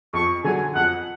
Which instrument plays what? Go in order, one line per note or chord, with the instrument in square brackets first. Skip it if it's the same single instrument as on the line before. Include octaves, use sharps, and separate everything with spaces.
[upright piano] F2 [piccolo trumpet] C#6
[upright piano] D3 F#3 [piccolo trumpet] G#5
[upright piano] F2 [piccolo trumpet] F#5